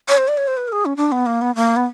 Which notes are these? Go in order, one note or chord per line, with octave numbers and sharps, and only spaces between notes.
C#5
C5
D5
C#5
C5
B4
A#4
G#4
C#4
D4
B3
A#3
B3
A#3
B3